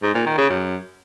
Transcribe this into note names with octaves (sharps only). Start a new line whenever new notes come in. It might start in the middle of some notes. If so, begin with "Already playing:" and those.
G#2
A#2
D#3
C#3
F#2